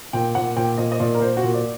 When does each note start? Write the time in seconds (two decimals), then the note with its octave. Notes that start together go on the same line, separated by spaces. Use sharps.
0.13 A#2 G5
0.35 A#2 F#5
0.56 A#2 G5
0.78 A#2 D#5
0.92 D#5
1.00 A#2 D5
1.15 A#4
1.20 A#2 C5
1.37 F#4
1.43 A#2
1.54 D5